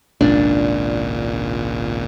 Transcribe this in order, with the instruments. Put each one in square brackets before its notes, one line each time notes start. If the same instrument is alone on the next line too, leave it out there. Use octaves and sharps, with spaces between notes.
[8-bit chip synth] G#1 C#2 A#2 [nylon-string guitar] D4